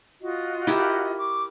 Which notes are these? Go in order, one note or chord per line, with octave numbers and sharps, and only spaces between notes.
F4 F#4 D#5
E4 G4 A#4
C#6 D6